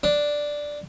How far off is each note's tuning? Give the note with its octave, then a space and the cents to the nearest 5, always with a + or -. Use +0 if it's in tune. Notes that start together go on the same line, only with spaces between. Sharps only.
D4 +0